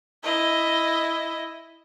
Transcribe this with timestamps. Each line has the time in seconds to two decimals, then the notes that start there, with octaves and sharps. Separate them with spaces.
0.24 E4 D#5